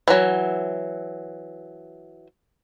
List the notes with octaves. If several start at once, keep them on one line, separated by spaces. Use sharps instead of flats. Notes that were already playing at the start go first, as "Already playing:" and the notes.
E3 F#3